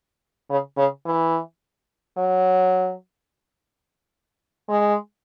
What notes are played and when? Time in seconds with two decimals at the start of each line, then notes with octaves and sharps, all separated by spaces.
0.49 C#3
0.77 C#3
1.06 E3
2.18 F#3
4.69 G#3